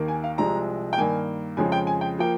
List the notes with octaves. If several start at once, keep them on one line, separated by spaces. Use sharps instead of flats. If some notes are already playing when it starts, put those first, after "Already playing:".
Already playing: D#2 D#3 A#3
G#5
F5
C2 C3 F3 G#3 A#5
G5
G2 D#3 A#3 G#5
F2 C#3 F3 G#3 G#5
G5
G#5
G5
F3 A#3 G5